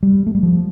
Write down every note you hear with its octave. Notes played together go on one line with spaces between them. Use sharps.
G3
A3
G3
F3